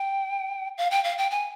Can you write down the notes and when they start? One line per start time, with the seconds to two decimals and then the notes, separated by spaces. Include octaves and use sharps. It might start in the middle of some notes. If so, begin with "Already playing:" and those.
Already playing: G5
0.78 F5
0.91 G5
1.04 F5
1.18 G5
1.31 G#5